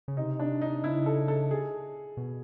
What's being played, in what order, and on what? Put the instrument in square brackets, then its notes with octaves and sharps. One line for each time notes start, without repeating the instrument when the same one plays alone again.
[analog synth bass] C#3
[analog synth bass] C3 [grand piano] D#4
[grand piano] D4
D#4
[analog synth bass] C#3 [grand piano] E4
[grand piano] A4
A4
G#4
[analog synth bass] B2